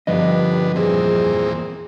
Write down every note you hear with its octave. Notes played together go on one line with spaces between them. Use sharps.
G2 D3 F3 G3 B3 D#5
E2 A#2 C4 G#4